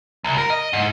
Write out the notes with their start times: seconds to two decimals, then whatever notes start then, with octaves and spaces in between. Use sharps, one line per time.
0.24 C2
0.38 A#4
0.50 D#5
0.73 G#2